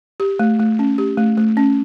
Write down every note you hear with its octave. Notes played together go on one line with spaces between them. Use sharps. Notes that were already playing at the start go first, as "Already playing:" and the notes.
G4
A3
A3
C#4
G4
A3
A3
C#4